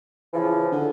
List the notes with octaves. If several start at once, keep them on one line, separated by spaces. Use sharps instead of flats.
C#3 E3 F3
D3